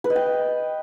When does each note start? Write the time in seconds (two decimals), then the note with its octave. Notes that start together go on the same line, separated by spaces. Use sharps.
0.04 B4
0.10 D#5
0.16 G5